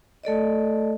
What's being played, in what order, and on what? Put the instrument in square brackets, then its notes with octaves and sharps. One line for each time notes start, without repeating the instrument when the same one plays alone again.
[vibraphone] A3 A4 D5 D#5